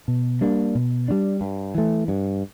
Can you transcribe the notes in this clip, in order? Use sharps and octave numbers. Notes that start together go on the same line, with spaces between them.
B2
G3 A#3 D4
B2
G3 A#3 D4
G2
E3 A3
G2